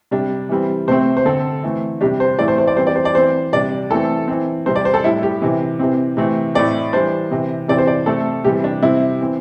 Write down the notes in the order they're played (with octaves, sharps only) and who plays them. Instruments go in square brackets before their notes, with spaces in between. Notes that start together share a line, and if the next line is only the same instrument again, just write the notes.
[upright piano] C3 G3 D4
E3 G3 C4
C3 A3 C4 C5
C5
D3 C4 A4
E3 A3 C4
C3 G3 D4 G4
C5
A2 E3 A3 C4 D5
C5
C5
D5
E3 G3 C4 C5
D5
C5
D5
E3 C4 C5
C3 G3 D4 D5
E3 A3 C4 A4
E3 C4
C3 G3 C4 C5
D5
C5
A4
A2 G3 D4 E4
G4
C3 E3 C4
C3 E3 C4
C3 E3 A3 C4
A2 A3 C4 D5
E3 G3 D4 C5
C3 E3 C4
C3 E3 C4 D5
C5
D5
C3 A3 C4 A4
C3 E3 G3 C4 G4
D4
C3 G3 C4 E4
E3 C4